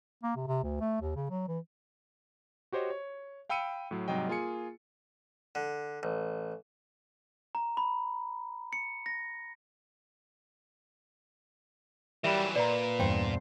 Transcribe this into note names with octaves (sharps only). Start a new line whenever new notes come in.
A#3
C3
C3
D2
A3
D#2
C#3
F#3
E3
F#4 G4 C5 C#5 D#5
C#5
F5 G5 B5 E6 C#7 D#7
A2 F#3
G#2 C3 F#3 G3 D#5 G5
A#3 F4 G#4 G#5 C#7
D3
A1
A#5
B5
C#7
A#6
E3 F#3 G3 A#4 E5
A#2 B4 D5 A#5
E2 G2 C5 G5